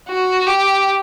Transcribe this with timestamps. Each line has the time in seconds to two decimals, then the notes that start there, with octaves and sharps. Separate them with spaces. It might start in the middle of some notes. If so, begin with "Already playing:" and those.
0.09 F#4
0.47 G4